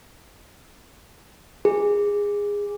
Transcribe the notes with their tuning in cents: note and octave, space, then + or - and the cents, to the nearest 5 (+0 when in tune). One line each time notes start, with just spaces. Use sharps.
G#4 -20